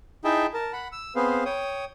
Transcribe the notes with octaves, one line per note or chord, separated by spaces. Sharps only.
D#4 E4 G#4 E5 G5 A5
A#4 A5
F#5 B5
E6
B3 C4 G#4 B4 C5 F5
C#5 G5 D#6